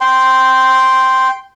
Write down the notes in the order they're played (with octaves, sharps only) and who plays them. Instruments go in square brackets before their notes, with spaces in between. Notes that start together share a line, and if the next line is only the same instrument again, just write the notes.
[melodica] G5 C6